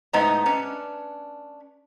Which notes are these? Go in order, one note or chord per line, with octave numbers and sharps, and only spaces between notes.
A2 G#3 B3 D#4 C5 A#5
C#4 D4 B4